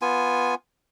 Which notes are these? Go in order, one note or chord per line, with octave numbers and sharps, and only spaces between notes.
B3 F4 G#5